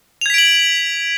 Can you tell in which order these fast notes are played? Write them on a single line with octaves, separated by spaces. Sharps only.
F7 G#6 B6 D7 F#7